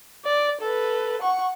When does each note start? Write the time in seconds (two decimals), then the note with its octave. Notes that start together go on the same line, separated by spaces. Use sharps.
0.25 D5
0.61 A4 B4
1.22 F#5 C#6